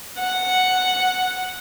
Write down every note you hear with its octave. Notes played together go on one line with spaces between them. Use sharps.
F#5